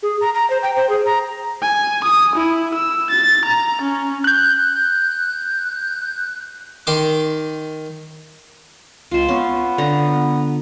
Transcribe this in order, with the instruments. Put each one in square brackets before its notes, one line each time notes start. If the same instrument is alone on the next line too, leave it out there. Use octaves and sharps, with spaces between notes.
[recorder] G#4
A#5
A#5
C5
G5
C5
G#4
A#5
[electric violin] G#5
D#6
E4
E6
A6
A#5
C#4
[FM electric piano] F#6 G6
[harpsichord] D#3 C6 D6
[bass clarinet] C#2 [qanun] F4 C5
[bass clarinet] B3 [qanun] C#4
[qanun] D3 A#5